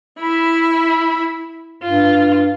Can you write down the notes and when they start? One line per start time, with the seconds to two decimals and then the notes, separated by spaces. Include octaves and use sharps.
0.19 E4 B5
1.83 G2 F4